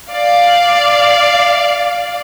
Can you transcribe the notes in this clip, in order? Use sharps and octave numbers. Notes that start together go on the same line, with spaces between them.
D5 F5